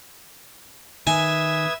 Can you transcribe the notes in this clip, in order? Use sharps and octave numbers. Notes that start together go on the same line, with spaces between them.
D#3 B4 E5 G#5 D#6 G#6